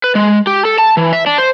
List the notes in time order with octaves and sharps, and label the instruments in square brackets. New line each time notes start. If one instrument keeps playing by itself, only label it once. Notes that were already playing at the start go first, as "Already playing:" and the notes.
[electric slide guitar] B4
G#3
G4
A4
A5
E3
E5
D4
C5